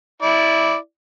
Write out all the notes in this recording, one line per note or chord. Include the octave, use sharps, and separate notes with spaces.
E4 D5